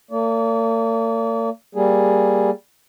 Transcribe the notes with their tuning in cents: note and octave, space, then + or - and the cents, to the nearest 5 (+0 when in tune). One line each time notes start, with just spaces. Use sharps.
A#3 -45 D5 -40
G3 +0 A#3 +0 G#4 +0